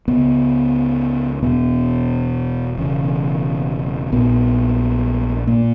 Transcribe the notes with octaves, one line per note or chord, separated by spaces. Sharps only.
C#2 C#3 B3
E1 E2 B2 B3
E1 E2 C#3
A#1 A#2 B3
A#2 A#3